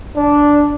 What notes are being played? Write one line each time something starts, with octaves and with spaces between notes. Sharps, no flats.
D4